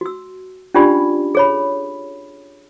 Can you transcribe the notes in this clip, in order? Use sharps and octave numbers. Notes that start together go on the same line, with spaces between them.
F#4 E6
C#4 D4 F4 G4 D5 B5
G#4 C#5 B5